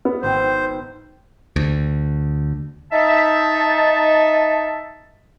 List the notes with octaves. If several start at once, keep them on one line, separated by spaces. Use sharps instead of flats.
B3
G#1 C5
D2
D#4 E5 A5